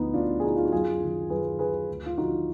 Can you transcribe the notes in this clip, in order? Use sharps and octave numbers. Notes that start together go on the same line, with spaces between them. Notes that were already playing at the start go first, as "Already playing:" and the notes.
Already playing: D2 D3 F3 B3 D#4
D2 D4 F4
G#4
D3 F3 D#4 F#4
F4
F#4
F#2 F4 G#4
D#3 F#3
F#2 G#4 B4
D#3 F#3 G#4 B4
D2
F4
D3 F3 D#4 F#4